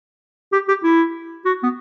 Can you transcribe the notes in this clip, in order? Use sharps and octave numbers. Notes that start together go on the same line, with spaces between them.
G4
G4
E4
F#4
B3